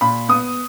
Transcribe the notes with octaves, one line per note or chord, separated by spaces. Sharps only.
A#2 B5
B3 D#6